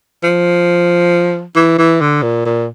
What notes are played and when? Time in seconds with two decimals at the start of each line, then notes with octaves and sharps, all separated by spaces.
0.23 F3
1.56 E3
1.78 E3
2.01 D3
2.22 A#2
2.45 A#2